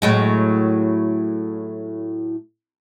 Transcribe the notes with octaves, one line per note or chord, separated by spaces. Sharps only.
A2 F#3 G#3